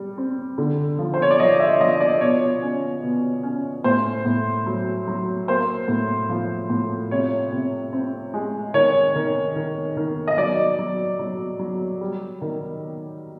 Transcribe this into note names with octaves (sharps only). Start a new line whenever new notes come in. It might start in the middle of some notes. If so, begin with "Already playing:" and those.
Already playing: G3
C4
D3
F3
C5
C#5
D5
F3 D#5
E5
F3 D#5
D5
B2 C#5
C#4
B2
C#4
A2 C5
A2
F#3
F#3
A#3 C5
A2
F3
A2
C3 C#5
C3
C4
G#3
D#3 C#5
D#3
D#3
D#3
D#5
F#3 D5
F#3
F#3
F#3
G3
D#3